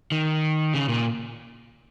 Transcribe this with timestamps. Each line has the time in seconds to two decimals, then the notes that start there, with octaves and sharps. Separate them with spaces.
0.12 D#3
0.74 C#3
0.89 A#2